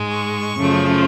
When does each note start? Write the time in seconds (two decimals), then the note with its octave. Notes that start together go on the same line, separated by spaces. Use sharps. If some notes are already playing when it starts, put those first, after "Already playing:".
Already playing: G#2 G#3
0.11 C#6
0.57 F#2 C#3 F3 A3